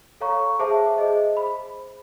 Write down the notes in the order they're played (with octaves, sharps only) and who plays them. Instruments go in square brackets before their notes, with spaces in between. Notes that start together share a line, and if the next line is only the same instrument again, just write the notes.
[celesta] A4 C#5 F5 A#5 C#6
G#4 C5 E5 A5 D6
G#4 C5 D#5
B5